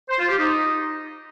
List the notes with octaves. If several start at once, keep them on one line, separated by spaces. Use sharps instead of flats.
C5
F4
G4
D#4